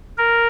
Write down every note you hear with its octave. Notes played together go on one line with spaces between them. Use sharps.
A#4